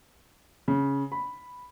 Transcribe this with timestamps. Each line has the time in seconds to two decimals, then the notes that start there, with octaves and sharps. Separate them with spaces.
0.68 C#3
1.12 B5